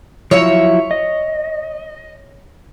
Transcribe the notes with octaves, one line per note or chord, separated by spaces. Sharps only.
F3 F#3 E4 C#5 E5
D#5